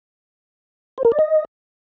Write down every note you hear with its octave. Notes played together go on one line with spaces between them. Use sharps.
C5
A#4
D5
D#5